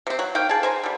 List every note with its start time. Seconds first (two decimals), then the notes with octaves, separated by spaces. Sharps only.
0.07 C3 C4
0.19 F#3
0.35 A#3 D#4 G5
0.49 G#4 A5
0.63 C5 G#5 A#5
0.83 D3 G3